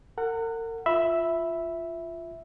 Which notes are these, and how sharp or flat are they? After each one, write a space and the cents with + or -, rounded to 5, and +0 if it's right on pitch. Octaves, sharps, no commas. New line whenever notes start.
A#4 -40 F#5 +0
F4 -5 E5 +0 B5 +0